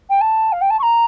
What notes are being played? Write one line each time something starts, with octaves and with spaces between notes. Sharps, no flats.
G5
A5
F5
G5
A5
C#6
A#5